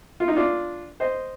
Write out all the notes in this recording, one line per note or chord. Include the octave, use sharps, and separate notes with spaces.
F4
D#4
D4 F4
C5 D#5